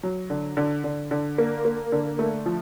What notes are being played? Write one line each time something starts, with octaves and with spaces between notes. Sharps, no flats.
F#3
D3
D3
D3
D3
A#3
A#3
D3
A3
F3